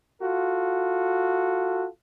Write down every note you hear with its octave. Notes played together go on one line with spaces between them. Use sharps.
F4 F#4 A4